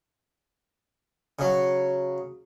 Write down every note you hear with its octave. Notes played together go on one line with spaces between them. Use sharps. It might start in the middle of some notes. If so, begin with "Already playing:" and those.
C#3 F#3